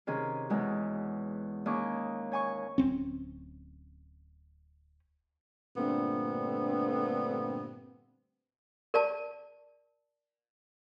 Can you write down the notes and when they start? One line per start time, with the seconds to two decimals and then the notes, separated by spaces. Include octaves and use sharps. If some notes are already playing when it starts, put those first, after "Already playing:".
0.07 C3 D#3 C#4 G#4
0.50 E2 B2 G#3 C#4
1.66 D#2 C#4 G#4 C#6 D6
2.32 C#5 G#5 C#6
2.78 D1 C4 C#4
5.76 G2 A#2 D3 A3 B3 C4
8.94 A#4 D5 A5